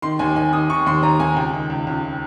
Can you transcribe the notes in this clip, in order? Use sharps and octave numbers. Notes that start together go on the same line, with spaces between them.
D#3 C6
D#2 G#5
D#3 G#5
D#3 D#6
D#3 C#6
D#2 C6
D#2 A#5
D#2 G#5
C#2 G5
D#3
C#2
C#2